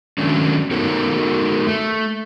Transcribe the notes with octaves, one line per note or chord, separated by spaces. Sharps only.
D#3 F#3 A3 C#4 D4
B3 D#4 F#4 A4 A#4 C#5
A3